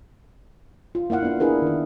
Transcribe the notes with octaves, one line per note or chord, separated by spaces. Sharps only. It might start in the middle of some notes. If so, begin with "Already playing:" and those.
F4
A#3 E4 F5 F#5
A#3 B3 D4
D4 E4 G#4 A#4 B4
D#3 E4